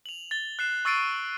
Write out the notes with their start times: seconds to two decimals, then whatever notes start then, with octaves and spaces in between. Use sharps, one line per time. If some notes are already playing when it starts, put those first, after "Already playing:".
0.06 F7 F#7
0.31 A6 G7
0.59 F#6 C7 E7
0.85 C#6 E6 A6 C7 D7 D#7